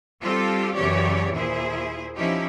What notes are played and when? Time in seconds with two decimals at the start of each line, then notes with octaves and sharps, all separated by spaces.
0.21 G3 C4 F4 G4 A4
0.74 F#2 C#3 E3 G4 C#5 D5
1.33 D#2 A#2 E4 G#4 C5
2.16 F3 C#4 D#4 E4 G4